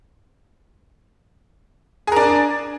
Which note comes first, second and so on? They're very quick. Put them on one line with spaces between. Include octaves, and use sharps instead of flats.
G#4 A#4 D4